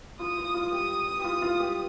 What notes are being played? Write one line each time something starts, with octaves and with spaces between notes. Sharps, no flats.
F4 D#6
F4
F4
G4 D#6
G4
F4 D#6
F4
G4